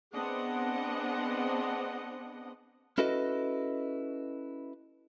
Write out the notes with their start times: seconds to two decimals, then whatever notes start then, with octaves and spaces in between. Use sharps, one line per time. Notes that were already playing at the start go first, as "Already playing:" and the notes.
0.13 B3 C4 D4 G#4 D#5 F#5
2.98 C#4 E4 F#4 A4 B4 D#5